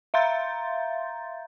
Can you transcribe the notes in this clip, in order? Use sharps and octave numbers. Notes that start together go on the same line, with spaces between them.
E5 F5 A#5 C6 G6 A6